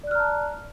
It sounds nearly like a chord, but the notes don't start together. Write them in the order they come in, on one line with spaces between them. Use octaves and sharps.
D5 F#6 F6 A#5 A5